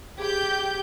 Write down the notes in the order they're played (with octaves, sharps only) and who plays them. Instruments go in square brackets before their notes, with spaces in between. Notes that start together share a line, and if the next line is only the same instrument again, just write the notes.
[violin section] G4 G6 [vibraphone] G#4